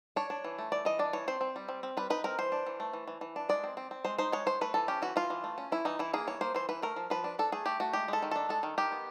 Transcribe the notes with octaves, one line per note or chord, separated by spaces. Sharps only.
D4 C#5
D4
E3
A3
E3 D5
E3 D#5
D4 D5
E3 C#5
C4 C5
C4
G3
C4
C4
G3 B4
D#4 B4
C4 A#4
E3 C5
D4
E3
A3
E3
E3
E3
D4
G#3 D5
C4
C4
C4
G#3 C5
D#4 C5
G#3 C#5
G#3 C5
A3 B4
E3 A4
C#4 G4
E3 F#4
E3 F4
E3
A3
C#4
E3 E4
E3 D#4
E3 E4
A#3 G#4
E3 C#5
A#3 C5
E3 C5
E3 B4
A3 A#4
F3
F3 B4
D4
D4 A4
A3 G#4
A3 G4
A3 F#4
G#3 G4
G#3 A4
D#3
D4 A4
G#3 A4
D#3
D#3 G4
B3